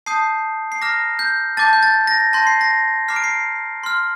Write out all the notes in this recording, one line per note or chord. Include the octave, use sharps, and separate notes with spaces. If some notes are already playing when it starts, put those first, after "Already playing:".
A5 D#6 G6 C7
C7
A#5 D6 F6 A#6
G6
A5 D6 G6 A6
G6
A6
A#6
A5 C6 G6 A#6
C7
A#6
A#5 D6 F6 C7
D7
C7
C6 F6